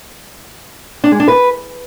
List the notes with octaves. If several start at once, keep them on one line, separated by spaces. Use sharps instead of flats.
D4
G#3
D4
B4